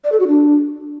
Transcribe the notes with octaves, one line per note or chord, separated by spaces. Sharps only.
D5
A4
F#4
D4